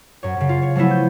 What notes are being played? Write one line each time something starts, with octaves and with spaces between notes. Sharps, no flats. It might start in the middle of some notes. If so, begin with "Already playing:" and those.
F#2 C#5
F#2 C#3
F4
C#5
F3 F#3 A3 B3 E4
G6